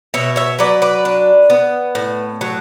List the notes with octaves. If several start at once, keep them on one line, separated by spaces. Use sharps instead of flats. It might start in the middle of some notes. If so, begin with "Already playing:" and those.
B2 C#5 E5
C#5 E5
F#3 B4 D5
B4 D5
D4
B3
A2
F#3